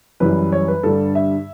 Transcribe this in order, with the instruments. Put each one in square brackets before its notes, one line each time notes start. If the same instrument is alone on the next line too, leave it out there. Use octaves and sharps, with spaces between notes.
[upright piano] F#2 E3 G3 B4
C#5
B4
G2 D3 G3 A4
E5